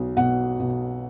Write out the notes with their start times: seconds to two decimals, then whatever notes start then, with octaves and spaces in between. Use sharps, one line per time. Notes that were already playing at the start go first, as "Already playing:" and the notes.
Already playing: B1
0.17 B2 F#5
0.60 B2